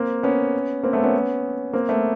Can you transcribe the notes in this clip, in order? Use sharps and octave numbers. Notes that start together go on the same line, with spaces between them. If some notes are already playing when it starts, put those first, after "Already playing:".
Already playing: A#3 C4
B3 C#4
A#3 C4
A3 B3
B3 C#4
A#3 C4
A3 B3